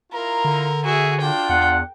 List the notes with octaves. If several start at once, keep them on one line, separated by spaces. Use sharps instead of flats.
E4 F4 A#4 A#5
D3
F#4 G#4 E5
D4 F4 G5
E2 F#5